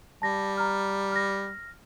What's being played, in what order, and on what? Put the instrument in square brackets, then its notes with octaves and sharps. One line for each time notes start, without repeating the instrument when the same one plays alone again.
[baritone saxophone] G3 [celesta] A5 A#6
[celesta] A#5 F6
F6 A#6